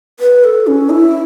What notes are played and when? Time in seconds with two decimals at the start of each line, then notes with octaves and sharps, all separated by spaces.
0.20 B4
0.44 A4
0.67 C#4
0.90 E4